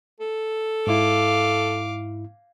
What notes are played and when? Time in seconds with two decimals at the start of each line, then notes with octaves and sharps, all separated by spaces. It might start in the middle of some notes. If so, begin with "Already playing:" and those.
0.20 A4
0.87 G#2 E4 F5 D6